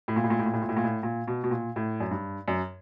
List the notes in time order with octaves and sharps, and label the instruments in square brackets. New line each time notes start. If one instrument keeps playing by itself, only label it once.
[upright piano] A2
A#2
A2
A#2
A2
A#2
A2
A#2
A2
A#2
A2
A#2
B2
B2
A#2
A2
F#2
G2
F#2